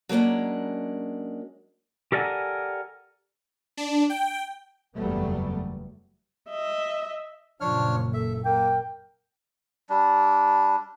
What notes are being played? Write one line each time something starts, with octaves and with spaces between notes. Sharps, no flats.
F#3 G#3 A#3 C#4 D4
G4 A4 A#4 D5 F#5 G#5
D4
G5
F#1 E2 F#3 G3 A3 B3
D#5 E5
F#1 A#2 F3 D4 C#5 F6
A4 E5
A#3 A#4 G5
G3 D4